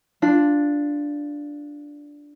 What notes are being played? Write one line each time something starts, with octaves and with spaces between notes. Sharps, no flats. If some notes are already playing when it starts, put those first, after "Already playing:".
D4 F4